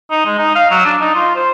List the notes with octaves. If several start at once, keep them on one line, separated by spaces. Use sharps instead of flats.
D#4
G#3
D#4
F5
F#3
D4
D#4
F4
C5